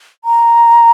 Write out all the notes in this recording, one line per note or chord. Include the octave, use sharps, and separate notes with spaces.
A#5